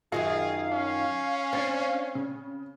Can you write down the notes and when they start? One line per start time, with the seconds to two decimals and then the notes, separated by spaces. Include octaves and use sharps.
0.12 F#2 D#3 F4 F#4 G#4 D#5 F5
0.72 C#4
1.53 C4 D4 A6 C7
2.15 C#3